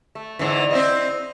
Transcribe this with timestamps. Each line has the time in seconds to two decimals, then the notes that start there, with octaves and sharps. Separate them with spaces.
0.15 A3
0.39 G#2 D3 E3
0.71 C4 E4 D#5